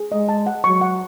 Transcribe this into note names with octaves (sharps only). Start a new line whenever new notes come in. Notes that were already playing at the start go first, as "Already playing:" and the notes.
Already playing: G#4
G#3 D#5
A5
F#5
F#3 C#6
F#5